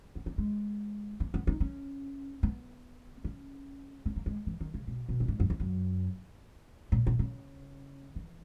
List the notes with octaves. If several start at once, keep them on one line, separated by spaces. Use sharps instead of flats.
B3
A#3
G#3
A#3
B3
D#4
C#4
B3
C#4
C#4
A#3
G#3
E3
D#3
C#3
B2
B2
A#2
G#2
F#2
E2
F#2
A#2
B2
C#3
E3